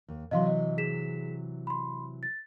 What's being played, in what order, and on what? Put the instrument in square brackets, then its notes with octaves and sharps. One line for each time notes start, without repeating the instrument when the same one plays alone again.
[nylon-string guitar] D#2
[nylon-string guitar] C3 E3 F#3 [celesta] D#5 F5 C6
[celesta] D#5
G#4 B6 E7
B5 C6
A6